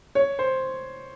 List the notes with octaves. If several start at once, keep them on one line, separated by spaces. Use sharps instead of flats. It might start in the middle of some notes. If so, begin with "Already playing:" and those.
C#5
C5